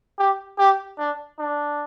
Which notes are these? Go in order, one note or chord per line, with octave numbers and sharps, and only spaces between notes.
G4
G4
D4
D4